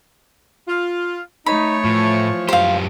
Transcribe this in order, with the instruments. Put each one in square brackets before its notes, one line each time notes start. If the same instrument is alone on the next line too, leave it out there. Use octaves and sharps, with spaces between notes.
[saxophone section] F4
[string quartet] A3 C#5 [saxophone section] D#4 [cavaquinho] B5
[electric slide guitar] A2 [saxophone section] E3 F3
[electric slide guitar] F#2 G4 [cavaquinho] C5 F5